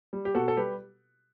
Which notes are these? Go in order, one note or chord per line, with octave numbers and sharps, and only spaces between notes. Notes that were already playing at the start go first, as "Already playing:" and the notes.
G3
G4
B2 F#4 A4
A4
G3 G4 B4